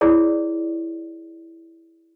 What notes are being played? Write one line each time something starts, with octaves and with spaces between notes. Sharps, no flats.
E4 G#4 C#5 D5